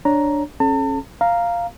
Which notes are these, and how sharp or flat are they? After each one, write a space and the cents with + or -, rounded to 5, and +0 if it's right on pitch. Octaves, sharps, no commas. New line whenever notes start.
D4 +0 C#5 +0 A#5 +5
C#4 -30 A4 -40 A5 +40
F5 -5 A#5 +0